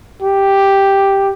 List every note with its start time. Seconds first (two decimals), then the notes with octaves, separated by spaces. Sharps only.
0.23 G4